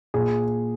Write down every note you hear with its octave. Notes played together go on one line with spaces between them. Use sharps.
A#2 G#4